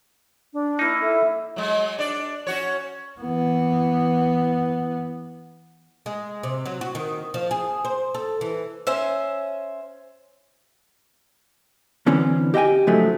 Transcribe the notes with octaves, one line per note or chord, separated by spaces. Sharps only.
D4
A#3 D#4 E4
A4 E5
F#3 G#3
D4 D5
C#4 F#4 C#5
E3 B3
G#3
C3
F#3
F#4
D#3
F3
G#4
C5
A4
E3
C#4 C5 E5
D3 E3 C4 C#4
G4 D#5 E5 G5 G#5
G#2 C#3 F3 F#3 G#3 A3